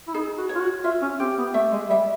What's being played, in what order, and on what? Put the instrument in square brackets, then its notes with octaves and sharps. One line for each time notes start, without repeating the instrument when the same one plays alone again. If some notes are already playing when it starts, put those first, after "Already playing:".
[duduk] E4
[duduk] D#4 [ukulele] G#4
[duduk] F#4
[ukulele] C#5
[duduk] F4
F#4
[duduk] F4 [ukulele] E5
[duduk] C#4
[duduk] C4 [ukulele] G4
[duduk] B3
[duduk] A3 [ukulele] E5
[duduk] G#3
[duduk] G3 [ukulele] E5